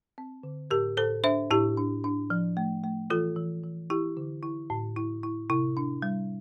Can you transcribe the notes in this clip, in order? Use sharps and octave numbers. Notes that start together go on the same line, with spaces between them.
C4
D3
A2 G4 A#4
A2 A4 C5
D4 C5 E5
A2 E4 G4
D4
D4
F3
A3
A3
E3 F4 A4
E3
E3
E4 G4
D3
E4
A2
E4
E4
C3 E4
D4
G3